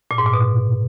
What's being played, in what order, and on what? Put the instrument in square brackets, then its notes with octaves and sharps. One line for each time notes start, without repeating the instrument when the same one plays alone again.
[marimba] A#2
G#2
A#2
B2